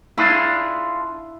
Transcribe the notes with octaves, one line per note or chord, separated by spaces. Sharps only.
D4 E4 F4 G#4